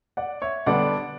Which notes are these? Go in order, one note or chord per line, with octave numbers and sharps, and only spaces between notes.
D5 F#5
C#5 E5
D3 G3 B3 D4 D5 F#5